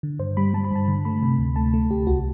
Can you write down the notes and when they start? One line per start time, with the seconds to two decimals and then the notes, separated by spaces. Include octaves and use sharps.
0.03 D3
0.19 G2 C5
0.37 G3 B5
0.54 G3 A5
0.64 B5
0.71 G2 A5
0.88 D3
1.05 A3 B5
1.23 C3
1.39 D2
1.56 A3 A5
1.74 A3
1.91 D2 G4
2.07 C2 F#4